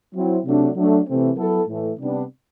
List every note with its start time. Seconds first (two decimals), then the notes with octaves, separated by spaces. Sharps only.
0.14 F#3 C4 E4
0.45 C3 F#3 A3 D4
0.76 F#3 A3 D4
1.07 C3 E3 A3 C4
1.37 F#3 B3 E4 A4
1.67 A2 E3 A3
1.99 C3 G3 B3 D4